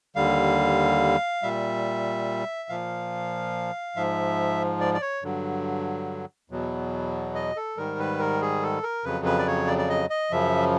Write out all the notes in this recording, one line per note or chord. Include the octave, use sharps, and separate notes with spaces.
D#2 D3 G3 F5
A#2 G3 E5
A#2 F3 F5
G#2 F3 E5
D5
D5
C#5
G2 D3 F#3
E2 B2 F#3
D#5
A4
G#2 D#3 G3 A#4
B4
A#4
G#4
A4
A#4
F2 C#3 F#3 B4
B4
D5
C#5
D5
D5
D#5
D#5
F#2 C#3 F3 E5